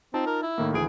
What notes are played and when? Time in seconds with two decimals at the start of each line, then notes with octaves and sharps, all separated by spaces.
0.14 C4 D#4 F4 A5
0.26 A#4
0.43 E4
0.58 A2 D#3 A#3
0.74 D2 E3 G#4 D7